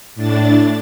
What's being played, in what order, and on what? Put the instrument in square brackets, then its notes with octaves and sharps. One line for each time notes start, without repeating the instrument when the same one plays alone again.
[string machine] A2 D4 A6